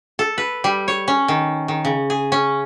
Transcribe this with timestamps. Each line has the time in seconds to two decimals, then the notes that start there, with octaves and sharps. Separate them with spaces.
0.19 A4
0.38 B4
0.64 G3
0.88 C#5
1.08 C#4
1.28 D#3
1.68 D#3
1.85 C#3
2.10 G#4
2.32 C#4